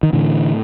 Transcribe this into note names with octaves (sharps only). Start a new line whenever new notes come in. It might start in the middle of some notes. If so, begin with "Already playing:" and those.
D#3
A2 D3 E3